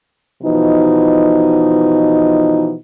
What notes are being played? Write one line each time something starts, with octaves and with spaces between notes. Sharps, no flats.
B2 E3 F3 D#4